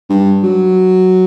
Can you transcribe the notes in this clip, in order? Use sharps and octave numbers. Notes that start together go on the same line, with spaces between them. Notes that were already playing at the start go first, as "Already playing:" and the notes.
G2
F#3